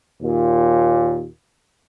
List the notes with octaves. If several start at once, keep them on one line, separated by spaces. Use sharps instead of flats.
D#2 A#2